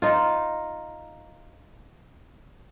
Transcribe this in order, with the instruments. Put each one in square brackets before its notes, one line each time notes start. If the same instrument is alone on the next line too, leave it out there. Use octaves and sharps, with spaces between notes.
[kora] D#4 F4